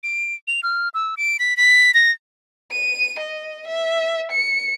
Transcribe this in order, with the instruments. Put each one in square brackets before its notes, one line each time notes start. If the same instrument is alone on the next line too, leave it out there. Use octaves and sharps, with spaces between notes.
[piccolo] D7
F7
F6
E6
D7
B6
B6
A#6
[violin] D#7
D#5
E5
C#7